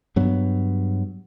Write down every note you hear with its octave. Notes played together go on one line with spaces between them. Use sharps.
G2 F#3 B3